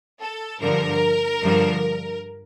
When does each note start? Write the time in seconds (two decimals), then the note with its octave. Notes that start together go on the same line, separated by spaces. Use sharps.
0.21 A4
0.60 G2 D3 F3 A#4
1.41 G2 D3 F3